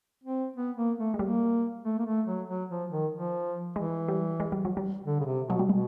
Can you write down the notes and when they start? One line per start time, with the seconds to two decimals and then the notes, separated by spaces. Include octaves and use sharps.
0.24 C4
0.56 B3
0.76 A#3
0.98 A3
1.14 G#3
1.19 G3 A#3
1.84 A3
1.99 A#3
2.06 A3
2.27 F#3
2.48 F#3
2.69 F3
2.91 D#3
3.12 F3
3.76 E3 G#3
4.08 G3
4.40 G#3
4.52 G3
4.65 F#3
4.77 G3
5.05 D3
5.20 C#3
5.25 C3
5.47 B2 F#3
5.59 G3
5.69 B2 G#3